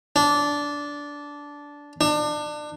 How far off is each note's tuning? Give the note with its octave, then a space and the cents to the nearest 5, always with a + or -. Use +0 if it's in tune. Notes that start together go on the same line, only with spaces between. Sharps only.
D4 -15
D4 +30